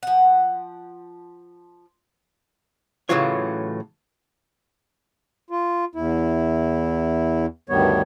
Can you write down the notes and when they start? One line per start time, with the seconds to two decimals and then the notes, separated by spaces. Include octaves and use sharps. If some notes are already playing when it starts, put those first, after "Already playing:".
0.03 F3 F#5
3.09 A2 C#3 E3 F#3 F4 C#5
5.50 F4
5.95 E2 E4
7.69 D2 G2 D#3 G3 B3 C#5